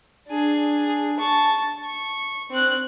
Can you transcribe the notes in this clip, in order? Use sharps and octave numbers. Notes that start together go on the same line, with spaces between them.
D4 G#4
A5 C#6
C#6
C4 F#6